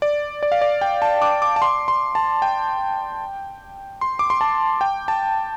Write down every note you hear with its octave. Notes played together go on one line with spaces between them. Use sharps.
D5
D5
F5
D5
G5
A5
D6
D6
A5
C6
C6
A5
G5
C6
D6
C6
A5
G5
A5